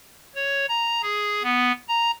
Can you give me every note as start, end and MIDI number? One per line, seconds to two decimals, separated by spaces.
0.35 0.66 73
0.69 1.02 82
1.03 1.43 68
1.43 1.72 59
1.89 2.11 82